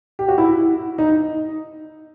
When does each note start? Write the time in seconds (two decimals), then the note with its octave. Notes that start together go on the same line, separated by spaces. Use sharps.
0.19 G4
0.28 F#4
0.38 E4
0.98 D#4